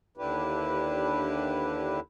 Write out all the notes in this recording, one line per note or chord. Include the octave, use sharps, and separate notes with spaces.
D#2 D3 D4 E4 G4 B4